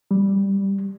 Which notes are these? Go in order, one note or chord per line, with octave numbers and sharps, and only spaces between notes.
G3